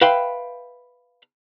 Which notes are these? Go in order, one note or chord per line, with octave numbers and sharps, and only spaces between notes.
B4 E5 F5 G5 B5 C6